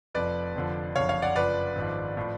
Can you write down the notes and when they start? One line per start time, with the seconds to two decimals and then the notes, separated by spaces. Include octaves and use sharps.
0.14 F1 F2 F3 B4 D5
0.55 F1 F2 D3 F3
0.95 F#1 F2 D3 C#5 F5
1.09 C#5 F5
1.22 D5 F#5
1.36 F#1 F2 F3 B4 D5
1.76 G#1 G#2 F3
2.17 A2 F3